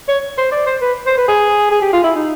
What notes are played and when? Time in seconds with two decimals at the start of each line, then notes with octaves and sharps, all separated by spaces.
0.08 C#5
0.38 C5
0.52 D5
0.66 C5
0.81 B4
1.07 C5
1.18 B4
1.28 G#4
1.71 G#4
1.82 G4
1.93 F4
2.04 E4
2.15 D#4